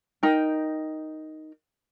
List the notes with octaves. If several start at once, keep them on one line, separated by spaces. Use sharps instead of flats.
D#4 A#4 G5